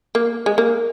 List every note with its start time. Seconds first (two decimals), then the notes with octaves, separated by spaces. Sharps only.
0.15 A#3
0.46 G#3
0.58 A#3